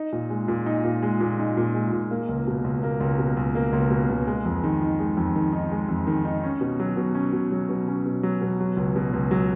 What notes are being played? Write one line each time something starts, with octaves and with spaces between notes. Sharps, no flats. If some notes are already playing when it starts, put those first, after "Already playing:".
Already playing: D#4
A#2
G#3
A#2
D#4
A#2
G#3
A#2
D#4
A#2
G#3
A#2
A#3
C#2
B2
C#2
A#3
C#2
B2
C#2
A#3
C#2
B2
C#2
G#3
F2
D#3
D#4
G#3
F2
D#3
D#4
G#3
F2
D#3
D#4
C#4
B2
F#3
B2
C#4
B2
F#3
B2
C#4
B2
F#3
B2
F#3
C#2
B2
C#2
F#3